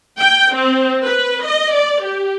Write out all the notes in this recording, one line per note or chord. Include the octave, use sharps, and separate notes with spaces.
G5
C4
B4
D#5
D5
G4